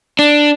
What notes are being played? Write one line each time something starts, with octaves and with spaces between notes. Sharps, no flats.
D4